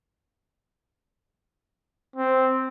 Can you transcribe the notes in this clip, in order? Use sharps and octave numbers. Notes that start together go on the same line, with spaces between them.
C4